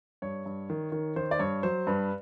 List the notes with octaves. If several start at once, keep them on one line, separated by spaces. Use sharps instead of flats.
G2 C#5
G2
D#3
D#3
D#3 C5
D5
G2 C#5
F#3 C5
G2 B4